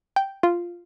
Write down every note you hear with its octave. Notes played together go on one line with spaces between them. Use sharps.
G5
F4